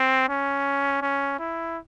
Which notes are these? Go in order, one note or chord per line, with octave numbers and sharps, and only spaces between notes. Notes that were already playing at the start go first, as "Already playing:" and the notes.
Already playing: C4
C#4
C#4
E4